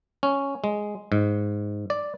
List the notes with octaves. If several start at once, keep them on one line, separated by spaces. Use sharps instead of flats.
C#4
G#3
G#2
D5